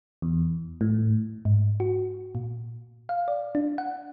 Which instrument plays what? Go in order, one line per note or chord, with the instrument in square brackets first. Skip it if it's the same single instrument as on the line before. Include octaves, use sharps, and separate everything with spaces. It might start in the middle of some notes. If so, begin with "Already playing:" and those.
[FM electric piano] E2
A2
[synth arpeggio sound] G#2
F#4
A#2
F5
D5
D4
F#5